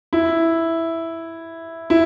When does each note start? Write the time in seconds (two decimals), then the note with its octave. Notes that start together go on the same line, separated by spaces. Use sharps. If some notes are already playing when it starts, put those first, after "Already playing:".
0.13 E4
1.90 E4